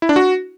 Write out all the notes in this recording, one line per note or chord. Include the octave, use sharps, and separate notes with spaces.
E4
D4
F#4